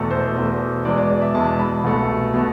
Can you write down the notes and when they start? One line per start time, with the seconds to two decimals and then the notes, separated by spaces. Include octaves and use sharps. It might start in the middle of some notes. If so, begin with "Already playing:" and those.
Already playing: E2 B2 A3
0.11 C5
0.36 E2 B2 A3
0.85 E2 B2 G#3 D5
0.98 D5
1.10 D5
1.22 E5
1.34 E2 B2 G#3 A5
1.59 B5
1.84 C2 B2 A3
2.34 B2 A3